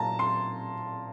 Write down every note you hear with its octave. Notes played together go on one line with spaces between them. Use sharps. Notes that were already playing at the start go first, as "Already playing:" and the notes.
Already playing: A#2 F#3 A5 A#5
C6